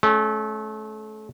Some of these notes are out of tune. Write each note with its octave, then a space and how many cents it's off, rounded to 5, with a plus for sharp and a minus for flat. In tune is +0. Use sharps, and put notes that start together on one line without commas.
A3 -30 C#4 +0